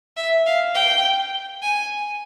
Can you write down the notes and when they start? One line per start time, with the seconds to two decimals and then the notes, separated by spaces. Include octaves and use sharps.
0.17 E5
0.46 F5
0.74 G5
1.62 G#5